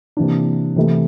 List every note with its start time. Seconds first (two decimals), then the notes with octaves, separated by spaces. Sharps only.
0.17 C3 E3 A#3 D4
0.76 C3 E3 A3 E4